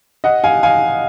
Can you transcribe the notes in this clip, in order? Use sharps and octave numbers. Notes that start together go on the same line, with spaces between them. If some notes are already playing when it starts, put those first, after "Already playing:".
D#5 F#5
F5 G#5
F5 G#5